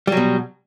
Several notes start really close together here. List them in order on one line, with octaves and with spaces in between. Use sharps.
G3 F#3 B2